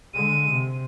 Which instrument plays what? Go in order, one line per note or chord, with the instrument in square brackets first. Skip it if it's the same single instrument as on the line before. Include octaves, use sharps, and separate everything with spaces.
[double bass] D3 G#3 [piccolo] D#7
[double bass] C3